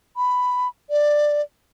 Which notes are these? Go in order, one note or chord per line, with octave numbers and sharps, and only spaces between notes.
B5
D5